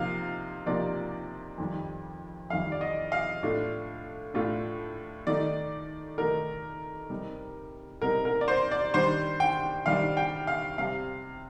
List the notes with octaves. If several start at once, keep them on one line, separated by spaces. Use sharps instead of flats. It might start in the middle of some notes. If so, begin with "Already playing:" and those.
Already playing: C3 F3 A#3 D#4 F5
C3 F3 A#3 D#4 D5
F2 D#3 G3
F2 D#3 G3 F5
D5
D#5
F5
A2 A3 D4 F4
A2 A3 D4 F4
D#3 A3 D#4 D5
D#3 A3 D#4 A#4
C3 G3 C4 D#4
C3 G3 C4 D#4 A#4
A#4
D5
C5
D5
D#3 G3 D4 C5
G5
D#3 G3 D4 F5
G5
F5
C3 G3 C4 F5